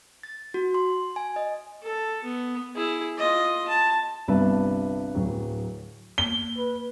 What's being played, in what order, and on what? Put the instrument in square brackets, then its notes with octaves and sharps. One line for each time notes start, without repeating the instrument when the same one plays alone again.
[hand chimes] A6
F#4
C6
G#5
D#5
[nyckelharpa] A4
B3
E4 G#4
F4 D#5
A5
[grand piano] G1 C2 G2 B4 E5 A5
D1 F#3
[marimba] A#3 [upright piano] G7
[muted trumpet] B4